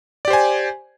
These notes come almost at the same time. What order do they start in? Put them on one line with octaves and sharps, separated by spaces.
D5 G4 C5 G#5